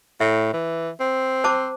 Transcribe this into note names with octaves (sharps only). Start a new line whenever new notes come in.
A2 E5
E3
C4
C5 A5 D6